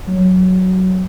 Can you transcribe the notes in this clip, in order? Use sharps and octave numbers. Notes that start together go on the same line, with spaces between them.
F#3